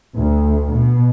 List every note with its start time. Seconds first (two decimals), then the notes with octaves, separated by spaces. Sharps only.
0.15 D2
0.71 B2